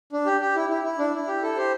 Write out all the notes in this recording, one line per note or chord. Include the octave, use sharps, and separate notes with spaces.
D4
G4
G4
E4
E4
E4
D4
E4
G4
E4 A4
G4 C5